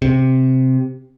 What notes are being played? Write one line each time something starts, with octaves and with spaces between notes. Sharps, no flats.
C3